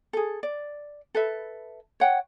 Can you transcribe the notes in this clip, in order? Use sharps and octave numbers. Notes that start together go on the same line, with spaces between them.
G#4 A4
D5
A4 B4 E5
C#5 F#5 G5